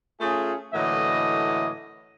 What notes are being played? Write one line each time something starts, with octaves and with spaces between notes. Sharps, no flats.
A3 C#4 F4 G#4
A2 D3 E3 F#3 A#3 D#5